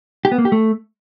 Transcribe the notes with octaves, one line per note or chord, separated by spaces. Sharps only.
G4
B3
A#3
G4
A3